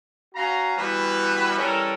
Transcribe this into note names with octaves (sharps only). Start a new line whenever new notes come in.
C#4 F#4 F5 A#5
E3 G3 B3 F#4 B4
E3 G3 C#4 A4 A#4